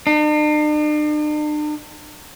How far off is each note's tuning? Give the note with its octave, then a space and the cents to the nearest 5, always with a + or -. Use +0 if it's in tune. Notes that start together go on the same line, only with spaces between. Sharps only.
D4 +45